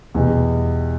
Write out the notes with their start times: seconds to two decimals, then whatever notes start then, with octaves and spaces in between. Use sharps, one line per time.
0.15 E2 B2 G3